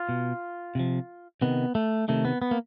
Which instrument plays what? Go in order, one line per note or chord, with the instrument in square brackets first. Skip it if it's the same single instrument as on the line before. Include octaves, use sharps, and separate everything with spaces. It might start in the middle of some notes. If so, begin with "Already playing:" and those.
Already playing: [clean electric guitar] F4
B2
C3 F3
C3 D#3 B3
A3
C3 D#3 A3
B3
B3
A#3